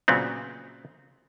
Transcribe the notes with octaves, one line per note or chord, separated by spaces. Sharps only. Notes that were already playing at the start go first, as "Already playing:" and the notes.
A#2 C#3 F#3 B3 C4